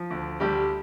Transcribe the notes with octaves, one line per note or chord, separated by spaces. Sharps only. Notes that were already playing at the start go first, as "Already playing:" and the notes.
Already playing: F3
D2
D2 G3 G4